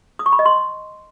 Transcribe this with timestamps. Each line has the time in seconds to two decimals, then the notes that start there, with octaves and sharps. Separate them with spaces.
0.19 D#6
0.26 C#6
0.32 B5
0.39 D#5
0.46 C6